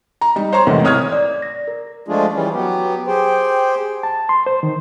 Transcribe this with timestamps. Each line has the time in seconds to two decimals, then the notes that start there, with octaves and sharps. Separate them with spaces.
0.21 A#5
0.36 G3 D#4
0.52 C5 C#5 A#5 C6
0.67 E2 G#2 C3 D#3 A3
0.84 C2 C#5 D#6 F6 G#6
1.12 D5
1.42 A#6
1.68 A#4
2.08 F3 G#3 A3 D4 F4 G#4
2.33 E3 G3 C#4
2.54 F#3 B3 G4
3.07 G4 G#4 C5 G5
4.03 A5
4.29 C6
4.46 C5
4.63 D#3